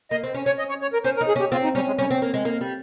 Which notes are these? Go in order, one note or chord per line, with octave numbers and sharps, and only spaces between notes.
A#3 D#5
C4
C#4
C#4 C#5
D#5
C#5
C#5
A#4
C#4 C5
A#4
D#4
G#4
C#4 G4
C4 F4
D#4
G3 C#4
G#3
G3 C#4
C4
A#3
G#3
A#3
G3